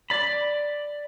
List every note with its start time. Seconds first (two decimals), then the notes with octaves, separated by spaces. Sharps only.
0.10 D5 B5